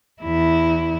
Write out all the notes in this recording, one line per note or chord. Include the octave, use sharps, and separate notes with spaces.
E2 E4